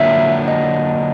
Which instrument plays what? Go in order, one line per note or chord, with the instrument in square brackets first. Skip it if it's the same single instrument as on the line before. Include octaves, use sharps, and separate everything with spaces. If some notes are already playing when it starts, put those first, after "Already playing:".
Already playing: [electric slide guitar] D3 F#3 A#3 D4 F4 [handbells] E5
[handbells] D#5